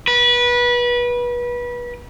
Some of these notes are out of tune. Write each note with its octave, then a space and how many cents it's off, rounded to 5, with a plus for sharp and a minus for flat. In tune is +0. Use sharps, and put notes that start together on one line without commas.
B4 -25